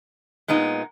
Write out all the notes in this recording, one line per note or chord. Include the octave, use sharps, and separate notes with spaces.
A#2 G#3 B3 D#4